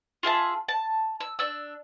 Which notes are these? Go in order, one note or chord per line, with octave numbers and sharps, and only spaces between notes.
F4 G#4 E5 A5
A5
E6
D4 E6